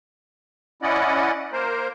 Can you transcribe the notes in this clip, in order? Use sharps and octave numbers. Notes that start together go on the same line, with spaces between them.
C#4 E4 D5 D#5 F#5
A#3 A#4 C5